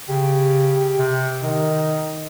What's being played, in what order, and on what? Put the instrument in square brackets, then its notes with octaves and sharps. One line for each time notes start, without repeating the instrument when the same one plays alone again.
[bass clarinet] C#3 [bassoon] G4
[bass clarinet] C3
[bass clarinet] D#3 [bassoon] D#4